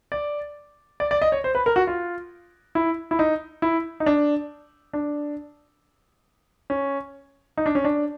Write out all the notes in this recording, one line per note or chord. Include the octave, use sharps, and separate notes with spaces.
D5
D5
D5
D#5
C#5
C5
B4
A#4
F#4
F4
E4
E4
D#4
E4
D#4
D4
D4
C#4
D#4
D4
C#4
D4